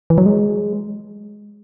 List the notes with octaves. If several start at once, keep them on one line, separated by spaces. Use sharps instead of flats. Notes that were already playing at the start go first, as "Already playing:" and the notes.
E3
F#3
G#3